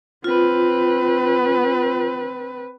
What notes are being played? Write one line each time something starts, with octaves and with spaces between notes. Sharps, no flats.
C4 F4 B4